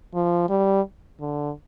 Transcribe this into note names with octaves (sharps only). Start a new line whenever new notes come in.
F3
G3
D3